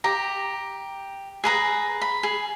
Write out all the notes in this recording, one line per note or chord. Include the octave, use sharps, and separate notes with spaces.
G4 A#5
G#4 B4 A#5
B5
G#4